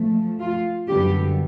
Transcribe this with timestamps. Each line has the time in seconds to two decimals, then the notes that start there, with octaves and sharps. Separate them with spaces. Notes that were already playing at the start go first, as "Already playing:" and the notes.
Already playing: F3 A3
0.39 F4
0.88 F#2 D3 G3 B3 G4